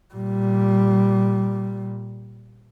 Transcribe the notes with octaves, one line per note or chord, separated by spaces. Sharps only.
A#2 G3